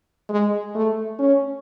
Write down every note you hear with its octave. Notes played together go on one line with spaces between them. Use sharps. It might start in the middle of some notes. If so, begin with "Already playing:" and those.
G#3
A3
C#4